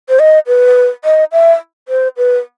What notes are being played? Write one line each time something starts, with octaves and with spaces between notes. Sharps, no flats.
C5
D#5
B4
D#5
E5
C5
B4